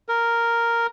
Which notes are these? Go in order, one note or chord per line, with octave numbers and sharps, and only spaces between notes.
A#4